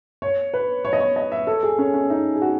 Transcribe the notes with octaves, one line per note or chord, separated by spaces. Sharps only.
C#5
B4
C#5
D#5
C#5
D#5
E5
A4
G#4
C#4
C#4
D#4
G#4
F#4